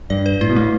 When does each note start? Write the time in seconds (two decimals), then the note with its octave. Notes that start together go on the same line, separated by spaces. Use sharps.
0.10 G2 D5
0.26 B4
0.41 A2 E4
0.50 B2
0.56 A2 A3